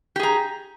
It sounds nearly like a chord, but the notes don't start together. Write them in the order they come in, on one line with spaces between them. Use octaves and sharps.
G4 G#4 A#5